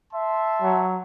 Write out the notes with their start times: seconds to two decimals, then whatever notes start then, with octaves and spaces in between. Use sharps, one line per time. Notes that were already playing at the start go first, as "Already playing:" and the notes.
0.12 E5 A5 C6
0.62 F#3